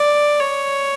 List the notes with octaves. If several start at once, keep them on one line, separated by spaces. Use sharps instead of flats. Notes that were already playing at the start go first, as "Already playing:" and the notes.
Already playing: D5
C#5